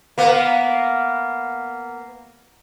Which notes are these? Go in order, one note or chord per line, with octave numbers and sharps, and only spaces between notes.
A#3 B3